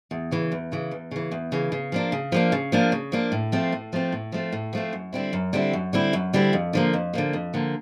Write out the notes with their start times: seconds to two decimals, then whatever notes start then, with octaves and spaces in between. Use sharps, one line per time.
0.11 E2
0.31 C#3 E3
0.52 E2
0.72 C#3 E3
0.91 E2
1.11 C#3 E3
1.32 E2
1.52 C#3 E3
1.72 C#3
1.92 F3 A#3 D4
2.12 C#3
2.32 F3 A#3 D4
2.52 C#3
2.72 F3 A#3 D4
2.92 C#3
3.12 F3 A#3 D4
3.32 A2
3.52 F3 A3 C4
3.72 A2
3.93 F3 A3 C4
4.12 A2
4.32 F3 A3 C4
4.52 A2
4.73 F3 A3 C4
4.93 F#2
5.13 D3 G3 C4 E4
5.33 F#2
5.53 D3 G3 C4 E4
5.73 F#2
5.93 D3 G3 C4 E4
6.13 F#2
6.33 D3 G3 C4 E4
6.53 F2
6.73 D3 F3 A#3
6.93 F2
7.14 D3 F3 A#3
7.33 F2
7.54 D3 F3 A#3